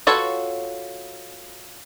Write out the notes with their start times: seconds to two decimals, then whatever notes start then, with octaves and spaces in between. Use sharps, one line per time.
0.07 F4 F#4 A4 B4 C#5